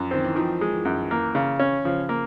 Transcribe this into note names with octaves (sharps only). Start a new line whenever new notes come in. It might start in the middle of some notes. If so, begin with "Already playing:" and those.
Already playing: F#2 F3
D#3 C4
E3
D#3 F3
G#3
E3
F#2
E3 A#3
C#3
C#4
C#3 F3
A#3